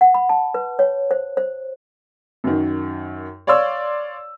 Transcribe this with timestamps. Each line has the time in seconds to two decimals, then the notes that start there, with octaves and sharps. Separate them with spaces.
0.01 F#5
0.14 B5
0.29 A5
0.54 B4
0.79 C#5
1.11 C5
1.37 C5
2.44 F#2 D#3
3.47 C#5 D5 F5 C6 E6